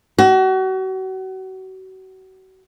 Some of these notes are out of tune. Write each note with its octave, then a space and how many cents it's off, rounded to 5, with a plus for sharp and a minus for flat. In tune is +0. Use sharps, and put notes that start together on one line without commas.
F#4 +35